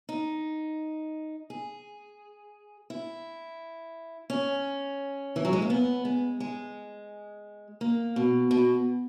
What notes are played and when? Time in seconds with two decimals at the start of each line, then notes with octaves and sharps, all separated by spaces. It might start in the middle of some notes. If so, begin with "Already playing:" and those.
0.09 D#4
1.50 G#4
2.90 E4
4.30 C#4
5.36 E3
5.45 F#3
5.53 G#3
5.62 A#3
5.70 B3
6.05 G#3
6.40 G#3
7.81 A#3
8.16 B2
8.51 B2